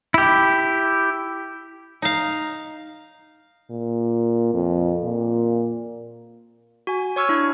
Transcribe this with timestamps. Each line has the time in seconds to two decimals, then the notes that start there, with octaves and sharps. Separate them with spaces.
0.14 E4 G4
2.02 D#4 F5
3.70 A#2
4.54 F2
5.03 A#2
6.87 F#4 G#5
7.16 C#5 C#6 E6 F6 G#6
7.29 D4 E4